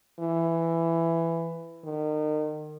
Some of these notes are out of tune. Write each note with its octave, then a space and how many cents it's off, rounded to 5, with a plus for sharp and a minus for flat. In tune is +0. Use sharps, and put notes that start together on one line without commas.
E3 +10
D#3 -35